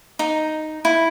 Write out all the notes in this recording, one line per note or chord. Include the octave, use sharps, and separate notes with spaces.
D#4
E4